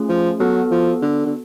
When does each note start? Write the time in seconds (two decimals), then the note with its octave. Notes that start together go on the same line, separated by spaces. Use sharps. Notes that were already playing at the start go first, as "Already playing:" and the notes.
Already playing: A3 C#4 F4 G#4
0.09 F3
0.40 F#3 B3 F#4 A4
0.71 F3
1.02 D3
1.26 D3